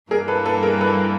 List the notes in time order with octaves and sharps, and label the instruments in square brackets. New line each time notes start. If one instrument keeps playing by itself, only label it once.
[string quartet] G2 E3 G3 A#3 [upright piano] G#4 A#4
[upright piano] A4 B4
A4 B4
G#4 A#4
A4 B4